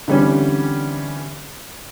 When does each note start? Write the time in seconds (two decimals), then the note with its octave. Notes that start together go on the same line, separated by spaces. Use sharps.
0.08 D3 E3 G3 C4 C#4